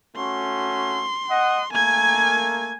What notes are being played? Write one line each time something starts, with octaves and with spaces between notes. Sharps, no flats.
A3 C#4 F#4 C6
D#5 F#5
A3 A#3 G#5 G#6